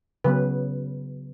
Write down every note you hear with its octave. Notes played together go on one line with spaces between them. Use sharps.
C#3 F#3 B3 B4